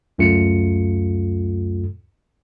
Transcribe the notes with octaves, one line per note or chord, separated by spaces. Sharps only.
C#2 F#2 A3 F4 A4 C#7